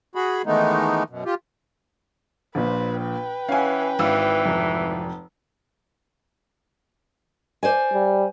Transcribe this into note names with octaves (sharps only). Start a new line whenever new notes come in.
F#4 G#4 B5
D#3 E3 G#3 A3 B3 D#4
F#2 B2
F4 G4
A#1 A#2 B4 C5
B4 G5
E3 C#4 F5 F#5 G#5
G#1 E3 F5 E6
F1
C5 D5 G#5
G3